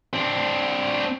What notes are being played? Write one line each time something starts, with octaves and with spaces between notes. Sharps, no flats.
C4 D4